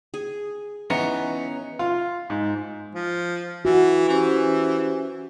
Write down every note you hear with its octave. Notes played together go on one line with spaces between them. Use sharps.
G#4
E3 B3 C#4 D#4 C#5
F4
G#2
F3
E3 F#4
E3 C#4 G4 C5